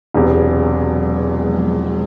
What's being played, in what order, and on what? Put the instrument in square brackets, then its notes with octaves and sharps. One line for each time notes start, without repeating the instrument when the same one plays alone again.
[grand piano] E1 E2 C3 [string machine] F#3
[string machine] B3
G#3
F3